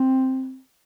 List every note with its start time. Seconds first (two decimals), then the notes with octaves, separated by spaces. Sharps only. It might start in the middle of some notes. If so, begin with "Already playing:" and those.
Already playing: C4